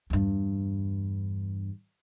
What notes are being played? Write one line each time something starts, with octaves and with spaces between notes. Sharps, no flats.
E2 G2